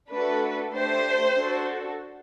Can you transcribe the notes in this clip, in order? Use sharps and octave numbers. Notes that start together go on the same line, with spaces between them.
A3 D4 F#4 A4 B4
A3 D4 G4 C5
D4 F#4 A4